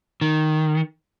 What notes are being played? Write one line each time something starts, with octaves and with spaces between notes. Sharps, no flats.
D#3